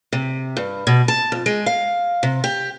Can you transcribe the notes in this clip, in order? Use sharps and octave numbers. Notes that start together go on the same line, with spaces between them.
C3
G2
B2
A5
F2
G#3
F5
C3
G4